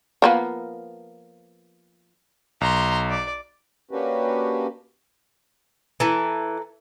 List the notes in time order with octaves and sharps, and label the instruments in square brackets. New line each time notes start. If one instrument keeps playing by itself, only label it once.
[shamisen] F3 A#3 B3
[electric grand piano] B1 [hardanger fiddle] A#5 C6
[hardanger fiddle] D5
[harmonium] A#3 C#4 D4 F#4 G4 B4
[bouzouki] E3 [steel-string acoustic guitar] A4 A#5